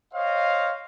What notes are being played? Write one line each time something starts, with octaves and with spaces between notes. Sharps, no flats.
C5 C#5 D#5 F5